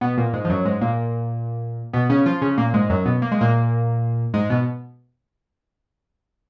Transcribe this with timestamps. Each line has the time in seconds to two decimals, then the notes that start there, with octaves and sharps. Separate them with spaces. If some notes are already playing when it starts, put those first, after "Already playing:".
0.01 B2 B3
0.18 A#2 A#3
0.33 G#2 G#3
0.45 F3
0.49 F#2 F#3
0.65 G#2 G#3
0.81 A#2 A#3
1.93 B2 B3
2.09 C#3 C#4
2.26 F3 F4
2.41 C#3 C#4
2.58 A#2 A#3
2.74 G#2 G#3
2.90 F#2 F#3
3.06 B2 B3
3.22 A#3
3.31 G#3
3.41 A#2 A#3
4.34 G#2 G#3
4.50 B2 B3